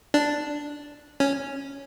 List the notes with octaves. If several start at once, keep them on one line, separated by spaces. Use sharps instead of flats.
D4
C#4